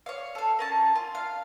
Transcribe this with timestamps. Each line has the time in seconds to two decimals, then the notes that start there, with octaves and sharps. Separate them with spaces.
0.06 C#5 F5
0.35 A4 F5
0.59 A#3 C#4 A5
0.95 F4
1.15 F5